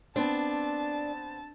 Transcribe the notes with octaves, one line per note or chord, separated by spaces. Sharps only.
B3 C4 D4 A5